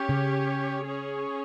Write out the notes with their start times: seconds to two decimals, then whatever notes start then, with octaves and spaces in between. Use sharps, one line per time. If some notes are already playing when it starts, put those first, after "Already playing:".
Already playing: C#4 G4 C#5
0.09 C#3
0.85 C#4 G#4 C#5